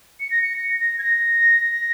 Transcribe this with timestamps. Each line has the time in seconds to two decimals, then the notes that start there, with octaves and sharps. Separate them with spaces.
0.20 C#7
0.31 A#6
0.42 C#7
0.56 A#6
0.80 A#6
0.98 G#6
1.03 A#6